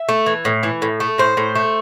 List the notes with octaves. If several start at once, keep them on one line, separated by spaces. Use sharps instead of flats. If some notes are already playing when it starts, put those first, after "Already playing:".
Already playing: E5
A3
E3
A2
E3
A2
A3
A2 C5
A2
A3